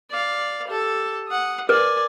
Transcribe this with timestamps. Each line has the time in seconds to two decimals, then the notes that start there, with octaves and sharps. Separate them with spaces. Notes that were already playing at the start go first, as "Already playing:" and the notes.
0.10 D5 F5
0.68 G4 A4
1.28 F#5 D#6
1.69 A#4 B4 D5 G#5